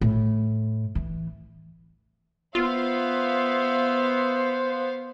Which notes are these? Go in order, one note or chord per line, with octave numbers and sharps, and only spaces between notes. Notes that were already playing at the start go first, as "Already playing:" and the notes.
A2
E3
B3 F4 C5 E5 F5